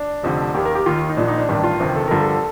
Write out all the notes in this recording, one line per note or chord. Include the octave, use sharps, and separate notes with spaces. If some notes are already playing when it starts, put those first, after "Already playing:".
Already playing: D4
F1 F2 D3
D#2 D#3 G4
A#4
G4
D#2 D#3 F4
D#4
A#1 A#2 F3 D4
D#4
D4
A1 G2 D#3 D4
F4
G1 F2 C3 D#3
A4
G1 G2 D3 F3 A#4
A4